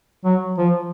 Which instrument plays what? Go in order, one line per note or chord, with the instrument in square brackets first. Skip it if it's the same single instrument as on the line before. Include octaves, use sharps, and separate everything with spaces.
[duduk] F#3
F3